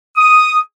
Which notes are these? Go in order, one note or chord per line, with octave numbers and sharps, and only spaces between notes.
D#6